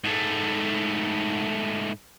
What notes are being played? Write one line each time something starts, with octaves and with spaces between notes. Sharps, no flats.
G#2 A3